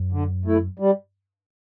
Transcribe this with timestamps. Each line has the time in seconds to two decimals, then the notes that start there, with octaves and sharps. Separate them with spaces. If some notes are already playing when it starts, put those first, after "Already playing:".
Already playing: F#2
0.12 D3
0.45 A3 E4
0.79 G3